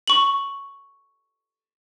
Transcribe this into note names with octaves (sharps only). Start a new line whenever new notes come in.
C#6 F#7